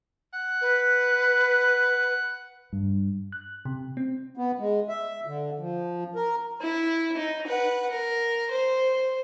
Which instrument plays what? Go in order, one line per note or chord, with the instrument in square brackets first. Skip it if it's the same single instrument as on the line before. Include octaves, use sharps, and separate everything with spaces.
[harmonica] F#5
[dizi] B4
[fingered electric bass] G2
[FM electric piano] F#6
C3
C4
[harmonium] B3
G#3
E5
D3
F3
A#4
[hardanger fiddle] E4
D#4
B4 F#5
A#4
C5